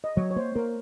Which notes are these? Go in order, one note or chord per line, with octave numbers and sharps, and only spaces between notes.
D#5
F#3 C#5
C#5
A#3 C5
A#3 A#4